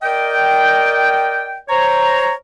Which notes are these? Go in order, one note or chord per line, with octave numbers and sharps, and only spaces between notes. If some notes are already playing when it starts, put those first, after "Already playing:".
A#4 D5 D#5 G5
C5 C#5 A#5